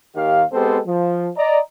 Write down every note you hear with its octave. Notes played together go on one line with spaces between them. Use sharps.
D#2 D#3 G4 F5
G#3 B3 C4 G4 A4 C5
F3
D5 D#5 A#5